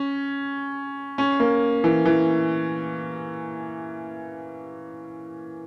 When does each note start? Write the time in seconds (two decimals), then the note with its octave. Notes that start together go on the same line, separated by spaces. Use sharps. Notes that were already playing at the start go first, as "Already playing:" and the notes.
Already playing: C#4
1.18 C#4
1.40 A#3
1.84 E3
2.05 E3